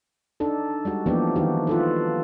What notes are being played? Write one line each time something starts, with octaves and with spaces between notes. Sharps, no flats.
D4 D#4 A4
G3 G#3 F#4
E3 F3 A#3 B3 D4 G4
D#3 E3 D#4 F#4 G4
F4 A4 B4